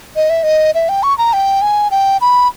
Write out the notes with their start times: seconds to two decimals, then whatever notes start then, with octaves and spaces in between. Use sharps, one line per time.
0.16 D#5
0.30 E5
0.43 D#5
0.75 E5
0.89 G5
1.03 C#6
1.18 A#5
1.33 G5
1.62 G#5
1.91 G5
2.21 B5